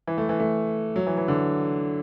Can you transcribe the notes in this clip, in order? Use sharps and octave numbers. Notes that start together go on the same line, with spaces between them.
E3
A3
E3
A3
F#3
E3
E3
D3